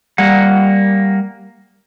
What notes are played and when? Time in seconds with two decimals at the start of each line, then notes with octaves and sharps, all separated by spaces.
0.18 G3 A#3 F#5